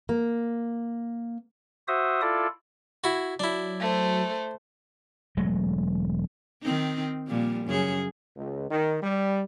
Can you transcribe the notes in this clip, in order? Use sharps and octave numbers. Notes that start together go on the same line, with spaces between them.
A#3
F#4 C5 E5 D#6
E4 F4 A4 D5
E4 F#4 G#6
F#3 D4 E4
A3 C5
E1 F#3 G#3 A3
D#3 C4 D#4
A#2 F3 G3
F#2 C#3 G#4
C#2
D#3
G3